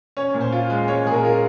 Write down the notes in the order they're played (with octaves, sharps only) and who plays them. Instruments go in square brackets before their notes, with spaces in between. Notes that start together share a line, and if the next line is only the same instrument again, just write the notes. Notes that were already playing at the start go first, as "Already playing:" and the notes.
[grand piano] C#4 [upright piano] C#5
[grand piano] A#2
[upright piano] C5
[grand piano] F4
G#3
[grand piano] C#4 [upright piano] C#5
[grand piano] A#2 [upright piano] G#4
[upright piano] A#4
[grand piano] F4 [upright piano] A#4